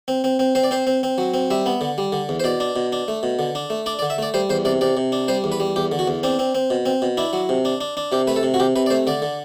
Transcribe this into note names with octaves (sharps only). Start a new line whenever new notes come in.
C4
C4
C4
C4 C5
D5
C4 C5
C4
C4
F#3
C4
G3 E5
B3
D3
G3
D3
E2
C5
B2 D5
D4
B2
D4
A3
B2
D3
D4
A3
D4 D5
D5
D3
E5
A3 D5
G3 C5
E2 C5
C3 D5
C3 D5
C3
D4
G3 C5
E2
B4
G3
E2 G4
D3
F#4
E2
C4 D4
C4
C4
B2
C4
B2
D4 E4
F#3
C3
D4
D4
D4
C3 G4
A3 B4
A4
C3
F#4
C3 G4
C3 B4
D5
A3 C5
D3 D5
D3